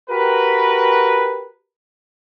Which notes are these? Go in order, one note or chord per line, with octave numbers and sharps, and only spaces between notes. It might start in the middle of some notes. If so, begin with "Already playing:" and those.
F#4 G4 A#4 B4